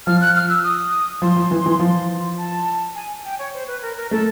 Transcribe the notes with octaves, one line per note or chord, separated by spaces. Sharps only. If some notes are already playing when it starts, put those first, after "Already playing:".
F3 F6
F#6
F6
E6
D#6
F3 C6
F3
E3
E3
F3
A5
G#5
G5
C#5
C5
B4
A#4
A#4
A3 A4